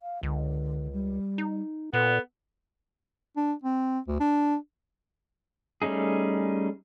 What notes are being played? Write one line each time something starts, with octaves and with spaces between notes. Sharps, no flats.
F5
C#2 D3
G3
D#4
A#2 B3 A4
D4
C4
D2
D4
G3 A3 C#4 D#4 G#4